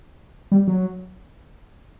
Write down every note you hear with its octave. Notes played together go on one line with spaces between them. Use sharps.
G3
F#3